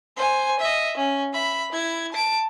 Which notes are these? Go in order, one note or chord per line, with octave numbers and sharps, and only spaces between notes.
C5 G#5
D#5 E5
C#4
E5 B5
E4 G#6
A5 D7